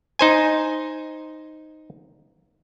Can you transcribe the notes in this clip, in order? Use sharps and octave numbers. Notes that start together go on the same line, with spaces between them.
D#4 C5 G#5